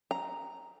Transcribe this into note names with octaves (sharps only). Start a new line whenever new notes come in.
A#5